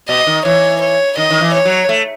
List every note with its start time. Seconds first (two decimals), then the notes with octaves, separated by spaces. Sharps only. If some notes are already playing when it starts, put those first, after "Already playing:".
0.08 B2 D#5
0.27 D#3
0.45 E3 C#5
0.81 C#5
1.17 D#3 D#5
1.31 D#3
1.41 E3
1.54 C#5
1.65 F#3
1.89 A3